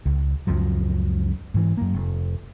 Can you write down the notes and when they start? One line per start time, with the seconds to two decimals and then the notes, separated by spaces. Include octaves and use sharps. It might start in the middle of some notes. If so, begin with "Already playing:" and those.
0.06 C#2
0.47 C#2 F#2 F3 F#3
1.54 G#2 E3
1.77 F#2 A#3
1.94 F1